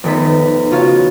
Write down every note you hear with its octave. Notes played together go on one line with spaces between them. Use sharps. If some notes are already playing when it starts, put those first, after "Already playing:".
F1 D#3 B3 A4 A#6 B6
C#3 F4 F#4 C#5 F5